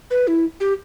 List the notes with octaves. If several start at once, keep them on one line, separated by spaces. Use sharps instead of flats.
B4
E4
G4